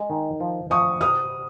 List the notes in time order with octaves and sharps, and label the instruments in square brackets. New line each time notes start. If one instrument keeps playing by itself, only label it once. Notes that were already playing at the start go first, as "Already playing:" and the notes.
Already playing: [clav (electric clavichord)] G#3
D#3
F3
[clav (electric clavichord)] F3 [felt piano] C#6 D#6
[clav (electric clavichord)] C3 [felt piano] D#6 F6